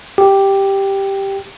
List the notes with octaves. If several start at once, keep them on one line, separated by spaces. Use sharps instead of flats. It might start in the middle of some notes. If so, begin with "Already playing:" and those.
G4